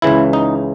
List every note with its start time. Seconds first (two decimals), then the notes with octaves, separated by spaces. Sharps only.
0.02 C#2 C#3 E3 E4
0.33 D#4